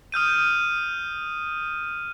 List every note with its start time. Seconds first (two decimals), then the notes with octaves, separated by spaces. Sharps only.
0.12 D#6 F6 G6 D#7